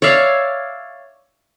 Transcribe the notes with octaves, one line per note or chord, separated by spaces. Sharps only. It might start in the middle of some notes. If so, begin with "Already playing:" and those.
C#5 D5 E5 F5